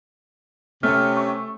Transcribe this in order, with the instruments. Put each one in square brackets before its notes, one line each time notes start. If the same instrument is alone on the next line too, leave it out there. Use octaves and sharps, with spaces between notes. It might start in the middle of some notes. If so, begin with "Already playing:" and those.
[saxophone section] C3 C#4 [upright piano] A3 [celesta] F6
[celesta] C#6